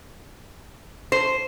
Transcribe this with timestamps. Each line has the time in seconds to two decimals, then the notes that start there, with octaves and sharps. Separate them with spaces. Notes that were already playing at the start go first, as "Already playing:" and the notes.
1.12 C5